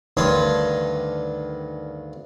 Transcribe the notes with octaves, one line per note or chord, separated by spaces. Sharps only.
D2 G2 D#3 C#5 A5 C6